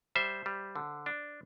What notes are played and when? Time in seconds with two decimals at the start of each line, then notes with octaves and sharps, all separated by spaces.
0.15 G3 C5 E5
0.46 G3
0.76 D3
1.06 D4